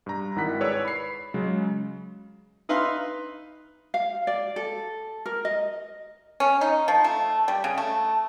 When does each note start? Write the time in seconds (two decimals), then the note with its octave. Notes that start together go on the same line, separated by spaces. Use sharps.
0.06 G2 A#5
0.36 G#1 D#3 E4 F#5 F#6 B6
0.60 G#4 B4 C#5 D5 E6
0.85 B5 C7
1.34 C#3 F#3 G#3
2.69 D#4 B4 E5 F5 C6
3.94 F5
4.27 D5
4.56 A4
5.26 A#4
5.45 D#5
6.40 C#4
6.61 D#4
6.88 F3
7.04 A3
7.48 G3
7.64 C#3
7.78 A3